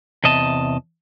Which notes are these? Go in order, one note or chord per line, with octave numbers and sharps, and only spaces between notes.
E2 C3 D#5 A5